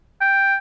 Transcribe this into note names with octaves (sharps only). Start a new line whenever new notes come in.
G5